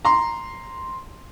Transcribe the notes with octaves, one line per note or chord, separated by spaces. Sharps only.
A#5 C6